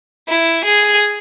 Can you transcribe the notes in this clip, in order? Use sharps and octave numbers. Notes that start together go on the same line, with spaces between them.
E4
G#4